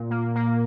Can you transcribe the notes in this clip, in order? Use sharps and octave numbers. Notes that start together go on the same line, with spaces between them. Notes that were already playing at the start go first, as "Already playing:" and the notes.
Already playing: A#2
A#3
A#3